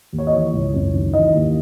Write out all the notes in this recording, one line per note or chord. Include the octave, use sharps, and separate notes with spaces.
D#2
C#5
D#5
E3 C#5
C#2
F#2
D#3
E3 D#5
D#2